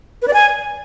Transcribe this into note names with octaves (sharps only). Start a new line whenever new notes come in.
B4
D5
G#5